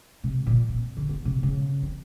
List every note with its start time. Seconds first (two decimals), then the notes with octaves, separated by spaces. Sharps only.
0.24 C3
0.47 A#2
0.69 C4
0.97 D3
1.09 B3
1.25 C3
1.43 C#3
1.83 C4